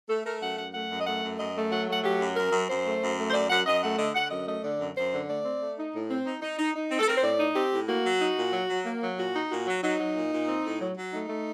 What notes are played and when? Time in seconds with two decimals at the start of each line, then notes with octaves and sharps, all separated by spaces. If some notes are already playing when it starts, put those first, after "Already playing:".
0.09 A3 A4
0.25 A3 A#4
0.41 F#2 F#5
0.57 F#2 F#5
0.74 A3 F#5
0.90 F#2
0.99 D#5
1.06 A3 F#5
1.22 F#2
1.39 F#2 D#5
1.55 A3
1.71 F#3 F#5
1.87 A3 F#5
2.04 F#3 G4
2.20 F#2
2.36 F#2 A#4
2.52 F#2
2.68 F#2 C5
2.85 A3
3.01 F#2
3.17 A3
3.29 C5
3.33 F#2 D5
3.50 F#2 F#5
3.66 F#2 D#5
3.83 A3 F#5
3.98 D3 D#5
4.14 D3 F#5
4.30 F#2 D#5
4.47 A3 D#5
4.63 D3 D5
4.79 F#2
4.96 F#2 C5
5.12 D3
5.28 A3 D5
5.45 C4
5.61 A3
5.78 D#4
5.94 A2
6.10 C4
6.26 D#4
6.41 D#4
6.59 D#4
6.75 D#4
6.90 C4
7.00 A4
7.07 C4 A#4
7.16 C5
7.24 A2 D5
7.39 D#4
7.55 C4 G4
7.71 A2
7.88 A#3 F#4
8.04 F#3
8.21 D#4
8.37 A#2
8.53 F#3
8.70 F#3
8.85 A#3
9.02 F#3
9.17 A#2 F#4
9.35 D#4
9.50 A#2 F#4
9.67 F#3
9.83 F#3 D#4
9.99 F#3
10.15 A#2
10.32 A#2
10.47 C4
10.65 A2
10.81 F#3
10.96 F#3
11.13 A3 D#4
11.29 A3